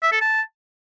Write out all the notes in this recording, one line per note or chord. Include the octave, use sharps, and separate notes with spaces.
E5
A4
A5